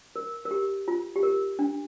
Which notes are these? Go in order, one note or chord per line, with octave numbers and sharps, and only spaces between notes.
A#4
A#4
G4
F4
G4
A#4
D4